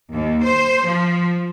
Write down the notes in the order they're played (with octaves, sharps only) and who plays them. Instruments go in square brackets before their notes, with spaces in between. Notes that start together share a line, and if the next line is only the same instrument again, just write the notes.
[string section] D#2
C5
F3